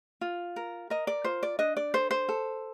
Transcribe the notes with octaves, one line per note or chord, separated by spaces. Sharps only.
F4
A#4
A#4 D#5
D5
F4 C5
D5
D4 D#5
D5
A4 C5
C5
A4